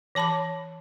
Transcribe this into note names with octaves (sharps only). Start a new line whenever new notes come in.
E3 C#5 A5 B5 D6